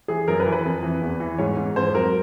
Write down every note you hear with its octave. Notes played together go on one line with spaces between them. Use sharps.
E3 G#4
F#2 A#4
B4
E3
B4
F2
E3
E2
E3
G#2 C#5
G#2
F2 C5
F#3 A#4